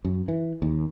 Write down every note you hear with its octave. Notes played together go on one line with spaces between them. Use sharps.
F#2
E3
D#2